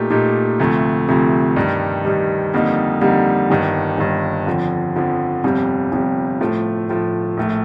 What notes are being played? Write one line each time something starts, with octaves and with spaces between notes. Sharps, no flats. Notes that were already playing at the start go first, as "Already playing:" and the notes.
Already playing: A#2 A3 D#4 G4
A#2 A3 D#4 G4
D2 C3 F3 A3
D2 C3 F3 A3
G2 D#3 G3
G2 D#3 G3
F2 D3 G3 A#3 D#4
F2 D3 G3 A#3 D#4
G1 G2 D#3
G1 G2 D#3
F2 D3 F3
F2 D3 F3
G1 F2 C3 G3
G1 F2 C3 G3
A2 F3 A3
A2 F3 A3
A#1 A2 A3